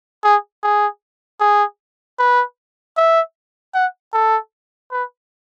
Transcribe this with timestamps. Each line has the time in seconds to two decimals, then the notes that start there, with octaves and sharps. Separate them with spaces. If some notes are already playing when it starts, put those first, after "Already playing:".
0.24 G#4
0.63 G#4
1.40 G#4
2.19 B4
2.97 E5
3.74 F#5
4.14 A4
4.92 B4